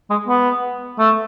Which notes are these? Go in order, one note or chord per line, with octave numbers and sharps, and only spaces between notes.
G#3
B3
A3